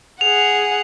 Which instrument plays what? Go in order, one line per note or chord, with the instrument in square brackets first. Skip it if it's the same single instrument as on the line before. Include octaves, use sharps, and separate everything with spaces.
[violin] G#4 F#5 [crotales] F7